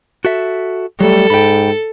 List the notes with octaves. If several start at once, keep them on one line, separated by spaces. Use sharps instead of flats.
F#4 A4 E5
F#3 G3 A3 A4
G#2 G5 B5